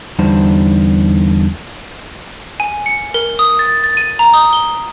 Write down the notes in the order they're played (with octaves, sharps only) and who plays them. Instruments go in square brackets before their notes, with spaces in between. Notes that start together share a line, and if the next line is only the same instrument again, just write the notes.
[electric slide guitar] E2 D3 G3 D4 D#4 C5
[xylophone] G#5
C#7
A#4
D#6
A6
A6
D#7
A#5
D#6
G7